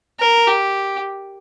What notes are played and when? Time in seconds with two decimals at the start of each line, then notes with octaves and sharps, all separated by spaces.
0.20 A#4
0.47 G4